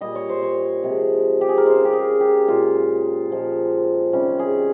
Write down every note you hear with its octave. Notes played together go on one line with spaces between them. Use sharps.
A#2 G3 D#5
C#5
C5
C#5
C3 F3 G#3
G4
G#4
A#4
C#3 G#3 C5
G4
G#4
G4
A#2 G#3 F4
A#2 F3 G#3
C3 D#3 G3 C#4
G#4